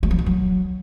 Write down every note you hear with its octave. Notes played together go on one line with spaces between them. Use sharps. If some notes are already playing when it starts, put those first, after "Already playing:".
G#3
F3
D#3
F#3